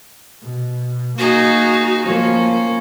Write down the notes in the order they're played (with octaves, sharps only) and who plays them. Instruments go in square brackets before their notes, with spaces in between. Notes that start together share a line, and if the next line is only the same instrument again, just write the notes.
[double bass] B2
[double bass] A#3 [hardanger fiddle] D#4 G#4 [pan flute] F#4
[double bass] F3 A#3 [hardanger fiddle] C#4